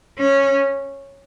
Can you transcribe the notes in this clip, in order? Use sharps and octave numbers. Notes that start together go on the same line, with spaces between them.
C#4